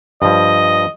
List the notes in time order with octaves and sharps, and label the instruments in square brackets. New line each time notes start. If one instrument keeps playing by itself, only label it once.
[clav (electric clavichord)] G2 F3 [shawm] D#5